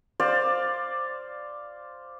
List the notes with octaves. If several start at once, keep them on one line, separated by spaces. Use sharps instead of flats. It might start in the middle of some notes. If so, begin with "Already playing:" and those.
C5 D5 F5